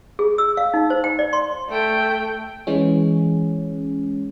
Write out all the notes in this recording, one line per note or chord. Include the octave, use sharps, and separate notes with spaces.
G#4
E6
F5
D#4
C5
G5
D5
C6
A3 G5
E3 G#3 C#4